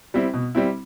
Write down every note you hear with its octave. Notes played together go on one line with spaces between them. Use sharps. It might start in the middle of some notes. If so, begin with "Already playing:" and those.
G3 C4 E4
B2
G3 C4 E4